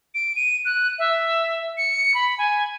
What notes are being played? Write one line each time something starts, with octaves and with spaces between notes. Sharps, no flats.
D7
D#7
F#6
E5
C#7
B5
G#5